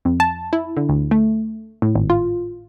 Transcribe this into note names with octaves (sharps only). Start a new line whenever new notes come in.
F2
A5
E4
D3
D2
A3
A2
G#1
F4